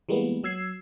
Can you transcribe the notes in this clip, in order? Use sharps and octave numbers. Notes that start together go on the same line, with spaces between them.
E3 G3 G#3 A#3 B3
F#3 E6 G#6 C7